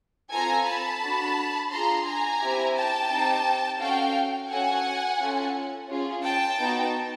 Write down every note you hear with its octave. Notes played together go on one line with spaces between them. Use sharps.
C4 F4 A4 G#5 A#5
A5 B5
D4 F#4 A4
D4 F4 G#4 A#5 C6
G#5 A#5
C4 E4 G4
G5 A5
C4 D#4 G4
C#4 F#4 A4 F5 G5
C#4 F#4 A4 F#5 G#5
C#4 F4 A4
C#4 F4 G#4
G5 A5
B3 D#4 F#4